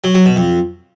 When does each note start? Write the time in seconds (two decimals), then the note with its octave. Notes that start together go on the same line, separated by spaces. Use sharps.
0.04 F#3
0.15 F#3
0.25 B2
0.36 F2